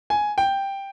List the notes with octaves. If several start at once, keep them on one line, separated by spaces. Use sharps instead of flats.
G#5
G5